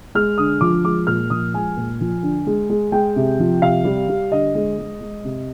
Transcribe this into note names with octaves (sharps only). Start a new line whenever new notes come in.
G#3 F6
D3 D#6
F3 D6
G#3 D6
A#2 F6
F3 D#6
G#3 G#5
A#2
F3
D3
G#3
G#3
G#3 G5
C3
F3
C3 F5
G3
G3
D3 D#5
G#3
G#3
G#3
C3